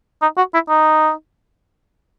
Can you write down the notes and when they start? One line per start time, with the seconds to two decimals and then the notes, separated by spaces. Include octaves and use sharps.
0.22 D#4
0.37 F#4
0.54 E4
0.68 D#4